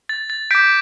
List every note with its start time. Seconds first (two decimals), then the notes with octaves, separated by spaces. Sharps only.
0.09 A6
0.30 A6
0.51 D6 G6 B6 D7